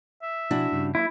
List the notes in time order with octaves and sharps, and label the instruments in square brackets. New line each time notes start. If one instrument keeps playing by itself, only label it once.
[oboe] E5
[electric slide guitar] B2 F3 G#5 [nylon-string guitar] D4 E4 F#4
[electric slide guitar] G2 C#3 G3
[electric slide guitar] F#3 A#3 [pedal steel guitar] E4